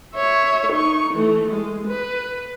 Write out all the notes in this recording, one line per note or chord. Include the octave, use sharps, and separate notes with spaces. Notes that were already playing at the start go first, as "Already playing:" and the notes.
C#5 E5
D#4 C#6
E3 A3
G#3
B4